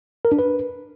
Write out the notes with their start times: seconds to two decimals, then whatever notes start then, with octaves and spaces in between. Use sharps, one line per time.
0.25 A#4
0.32 D4
0.39 B4